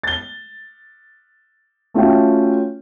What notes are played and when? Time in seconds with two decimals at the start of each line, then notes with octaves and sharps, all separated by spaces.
0.03 A6 G7
1.94 A3 C#4 F4 F#4 E5 G5